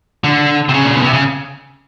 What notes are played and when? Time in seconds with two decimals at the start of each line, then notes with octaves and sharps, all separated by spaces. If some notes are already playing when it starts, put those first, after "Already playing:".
0.24 D3
0.69 C3
0.74 C#3
0.85 A#2
0.95 B2
1.04 C3
1.13 C#3